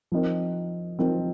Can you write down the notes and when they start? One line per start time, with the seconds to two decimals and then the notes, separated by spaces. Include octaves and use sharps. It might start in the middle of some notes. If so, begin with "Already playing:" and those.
0.12 F3 C4 D#4 A#4
0.99 F3 C4 D#4 A#4